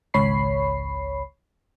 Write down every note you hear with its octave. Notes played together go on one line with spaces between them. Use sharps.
G#1 C#2 C#5 B5 C7